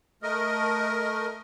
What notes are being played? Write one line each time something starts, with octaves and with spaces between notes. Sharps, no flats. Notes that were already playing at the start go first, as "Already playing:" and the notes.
A3 A#4 D#5